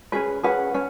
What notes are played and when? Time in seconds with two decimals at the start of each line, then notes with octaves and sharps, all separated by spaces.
0.12 C#4 G#4 B4
0.43 C#4 G#4 B4 F#5
0.74 C#4